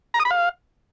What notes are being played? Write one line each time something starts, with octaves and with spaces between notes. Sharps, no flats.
A#5
D#6
B5
F5